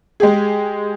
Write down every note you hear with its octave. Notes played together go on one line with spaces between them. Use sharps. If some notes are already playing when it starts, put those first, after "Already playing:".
G#3 G4 G#4